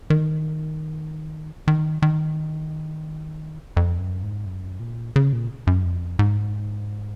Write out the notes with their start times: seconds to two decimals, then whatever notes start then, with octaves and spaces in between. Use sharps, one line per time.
0.10 D#3
1.68 D#3
2.02 D#3
3.77 F2
3.99 F#2
4.23 G#2
4.46 F#2
4.80 A#2
5.16 C#3
5.33 A#2
5.67 F#2
5.85 F2
6.19 G#2